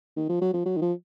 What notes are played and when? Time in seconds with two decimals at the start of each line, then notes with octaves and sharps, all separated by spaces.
0.17 D#3
0.29 F3
0.41 F#3
0.53 F3
0.65 F#3
0.77 D#3
0.81 F3